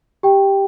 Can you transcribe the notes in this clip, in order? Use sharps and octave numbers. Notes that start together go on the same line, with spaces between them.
G4 G5